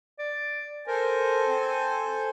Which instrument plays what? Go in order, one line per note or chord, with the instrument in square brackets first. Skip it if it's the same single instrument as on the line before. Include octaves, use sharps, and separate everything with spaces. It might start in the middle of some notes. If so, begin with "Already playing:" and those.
[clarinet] D5
[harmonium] A4 C5 G#5 [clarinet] A#4
[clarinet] C4